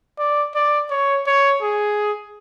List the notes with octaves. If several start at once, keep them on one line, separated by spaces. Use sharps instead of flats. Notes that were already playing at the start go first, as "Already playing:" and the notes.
D5
D5
C#5
C#5
G#4